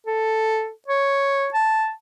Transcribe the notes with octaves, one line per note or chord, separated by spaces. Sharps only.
A4
C#5
A5